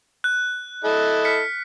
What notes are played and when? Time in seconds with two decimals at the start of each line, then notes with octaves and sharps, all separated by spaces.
0.24 F#6
0.84 E4 A4 D#5
1.25 F6 B6 C#7